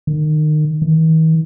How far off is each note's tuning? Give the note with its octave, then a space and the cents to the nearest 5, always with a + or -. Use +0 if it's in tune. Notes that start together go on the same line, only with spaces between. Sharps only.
D#3 -30
D#3 +45